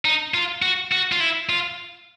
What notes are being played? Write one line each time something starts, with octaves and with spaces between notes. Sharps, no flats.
D#4
F4
F#4
F#4
F4
E4
F4